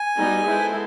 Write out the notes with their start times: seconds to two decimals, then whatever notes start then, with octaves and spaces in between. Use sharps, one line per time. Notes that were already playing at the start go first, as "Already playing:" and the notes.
Already playing: G#5
0.17 G3 B3 D#4 F#4
0.47 G#3 B3 E4 A4 C5